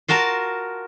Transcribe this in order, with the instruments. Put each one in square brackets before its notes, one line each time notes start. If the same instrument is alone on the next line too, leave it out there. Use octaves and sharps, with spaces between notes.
[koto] F4 F#4 A#4 A5